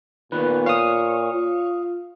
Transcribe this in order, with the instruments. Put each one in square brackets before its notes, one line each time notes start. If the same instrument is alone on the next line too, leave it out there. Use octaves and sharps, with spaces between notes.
[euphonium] A#2 [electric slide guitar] D#3 B3 [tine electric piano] B4
[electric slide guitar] C#5 [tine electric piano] F5 D#6
[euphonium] F4